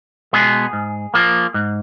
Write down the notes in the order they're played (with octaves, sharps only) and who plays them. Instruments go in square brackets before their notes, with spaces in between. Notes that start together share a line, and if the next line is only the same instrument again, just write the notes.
[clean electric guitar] B2 G#3 B3 G#4
G#2
F3 A#3
G#2